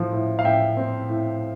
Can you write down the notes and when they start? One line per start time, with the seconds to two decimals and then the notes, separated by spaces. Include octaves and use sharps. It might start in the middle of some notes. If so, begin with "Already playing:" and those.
Already playing: A2 F3
0.12 A2
0.39 F5
0.44 A2 E5 G5
0.77 C4
1.09 A2